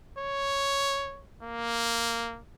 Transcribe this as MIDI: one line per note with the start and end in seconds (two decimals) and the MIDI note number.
0.19 1.23 73
1.43 2.39 58